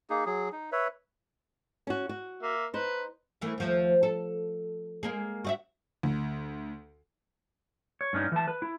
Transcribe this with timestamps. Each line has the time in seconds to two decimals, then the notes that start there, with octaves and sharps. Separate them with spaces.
0.10 A#3 D#4 G#4
0.26 F#3 G#4
0.52 D#4
0.72 B4 C#5 E5
1.87 C#4 F#4
2.09 F#4
2.43 A#3 E5
2.74 D#4 B4 C5
3.41 E3 A3 A#3
3.58 D#2 F3 A3
4.03 A4
5.03 G#3 A#3 G#4
5.45 F#4 D#5 E5
6.03 D2
8.01 C#5
8.13 G2 C#4 D#4
8.32 E3 A5
8.48 B4
8.62 E4